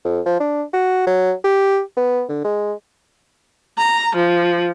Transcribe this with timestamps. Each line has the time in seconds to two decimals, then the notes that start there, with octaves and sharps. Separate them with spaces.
0.05 F2
0.26 F3
0.40 D4
0.74 F#4
1.07 F#3
1.44 G4
1.97 B3
2.29 D3
2.44 G#3
3.78 A#5
4.15 F3